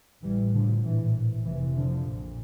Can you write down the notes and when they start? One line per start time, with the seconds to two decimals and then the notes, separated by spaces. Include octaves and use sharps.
0.23 A1 A2 E3 G3
0.54 D3 F3
0.84 A#1 A2 E3
1.45 F1 F2 C3 E3
1.75 D3 F3
2.06 A#1 A#2